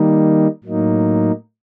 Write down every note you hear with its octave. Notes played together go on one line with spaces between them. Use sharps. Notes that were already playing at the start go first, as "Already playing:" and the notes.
Already playing: D#3 G3 A#3 D#4
A2 F#3 A#3 D#4